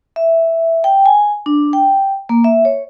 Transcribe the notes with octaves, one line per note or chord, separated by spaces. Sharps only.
E5
G5
G#5
D4
G5
A#3
E5
C#5